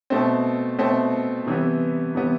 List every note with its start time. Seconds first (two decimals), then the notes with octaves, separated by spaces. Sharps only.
0.10 B2 A3 C4
0.78 B2 A3 C4
1.47 C3 E3 G3 B3
2.15 C3 E3 G3 B3